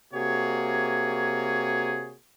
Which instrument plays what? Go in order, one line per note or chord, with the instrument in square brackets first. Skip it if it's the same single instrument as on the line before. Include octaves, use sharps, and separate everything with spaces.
[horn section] C3 A#3 F#4 G#4 C#5